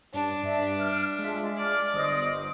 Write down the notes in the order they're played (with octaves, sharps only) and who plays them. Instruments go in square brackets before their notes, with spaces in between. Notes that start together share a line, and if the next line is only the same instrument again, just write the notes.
[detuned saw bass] G2 [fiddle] D4 [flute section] A5
[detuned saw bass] G2 [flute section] D5 E5
[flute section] F6
[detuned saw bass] G#3 [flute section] F4 E5 A5
[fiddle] D5 [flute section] D6 F6
[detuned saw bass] G1 [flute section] C5 D#5 D#6